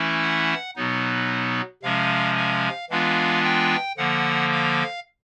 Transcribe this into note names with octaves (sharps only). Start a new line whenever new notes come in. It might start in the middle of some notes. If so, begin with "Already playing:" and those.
Already playing: E3 A3 C#4 E4
F#5
B2 F#3 B3 D#4
C3 F3 G#3 C#4 F5
F5
E3 G#3 B3 D4 F4 F5
G5
D3 F3 A#3 F#5
F5